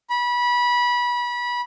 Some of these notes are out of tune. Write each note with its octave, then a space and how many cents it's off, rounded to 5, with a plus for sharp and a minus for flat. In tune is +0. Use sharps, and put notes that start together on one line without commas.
B5 -25